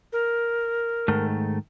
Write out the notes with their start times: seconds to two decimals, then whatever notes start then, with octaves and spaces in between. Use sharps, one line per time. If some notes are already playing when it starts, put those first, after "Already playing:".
0.12 A#4
1.08 G#2 D#3 A3